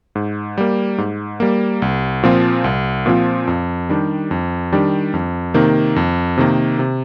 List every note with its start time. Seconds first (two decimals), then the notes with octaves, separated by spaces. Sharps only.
0.15 G#2
0.58 G3 A#3
0.98 G#2
1.40 G3 A#3
1.82 C2
2.23 A#2 F3 C4 F4
2.64 C2
3.06 A#2 F3 C4 F4
3.47 F2
3.89 D#3 G3 D4 G4
4.31 F2
4.72 D#3 G3 D4 G4
5.14 F2
5.54 C3 D#3 A#3
5.96 F2
6.37 C3 D#3 A#3
6.79 C3